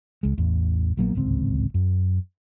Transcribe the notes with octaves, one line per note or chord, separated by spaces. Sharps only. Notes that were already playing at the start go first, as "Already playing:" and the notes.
C#2 G#3
A1 E2
A#1 F#3 A#3 B3
D1 G#1 C#2 C4
F#2